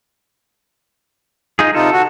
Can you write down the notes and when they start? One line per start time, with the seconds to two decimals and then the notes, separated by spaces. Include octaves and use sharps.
1.59 D#4 F4 G#4
1.75 C3 D#4 F4 A4
1.92 F#4